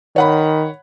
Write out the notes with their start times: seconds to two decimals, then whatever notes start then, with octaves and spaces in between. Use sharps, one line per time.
0.16 D#3 C#5 F#5 B5